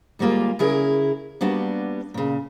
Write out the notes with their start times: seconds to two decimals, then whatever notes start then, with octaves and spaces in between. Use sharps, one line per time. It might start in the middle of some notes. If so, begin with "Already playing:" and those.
0.19 D2 G3 G#3 A#3 F4
0.59 C#3 E4 G#4 A#4
1.41 G3 A#3 B3 D4 F#4
2.14 A#2 C#3